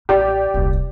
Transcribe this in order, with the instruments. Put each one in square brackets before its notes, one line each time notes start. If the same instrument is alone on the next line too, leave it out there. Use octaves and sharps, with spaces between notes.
[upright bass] A1 [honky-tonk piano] G4 D5
[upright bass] D#1 C2